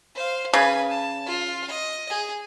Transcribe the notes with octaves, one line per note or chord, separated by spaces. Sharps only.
C5 F5
C#3 B4 G#5
A5
F4
D#5
G#4